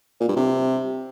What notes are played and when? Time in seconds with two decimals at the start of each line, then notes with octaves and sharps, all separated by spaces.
0.20 A#2
0.28 G2
0.36 C3